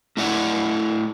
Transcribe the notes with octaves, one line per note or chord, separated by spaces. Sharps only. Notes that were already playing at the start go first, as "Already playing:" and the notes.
A3 E4 D5 F#5